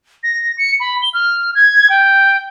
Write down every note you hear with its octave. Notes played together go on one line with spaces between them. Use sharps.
A#6
C#7
B5
G7
F6
G#6
G5